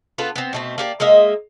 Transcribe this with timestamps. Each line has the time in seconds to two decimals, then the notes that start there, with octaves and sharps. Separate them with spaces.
0.18 B3 F4 A4 B4
0.36 B3 C4
0.53 B2 A3 C4
0.78 A#3 G4 D5
1.00 G#3 A#3 D#5 E5